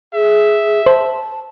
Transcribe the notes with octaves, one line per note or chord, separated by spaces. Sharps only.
G#4 E5
C5 A5